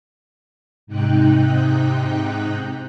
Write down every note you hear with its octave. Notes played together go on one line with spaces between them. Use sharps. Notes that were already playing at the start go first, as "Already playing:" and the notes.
G#2 C3 D#4 G5 F#6